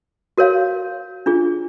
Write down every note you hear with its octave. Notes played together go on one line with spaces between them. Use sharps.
F#4 A#4 C#5 F5
D4 F4 G#4